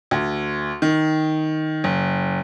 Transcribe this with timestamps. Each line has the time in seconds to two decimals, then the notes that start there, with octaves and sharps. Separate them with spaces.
0.11 D2
0.82 D#3
1.84 F#1